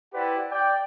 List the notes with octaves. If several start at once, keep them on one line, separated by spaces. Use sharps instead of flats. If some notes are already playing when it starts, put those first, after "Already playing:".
E4 G4 B4 C5 D5 F#5
D5 G5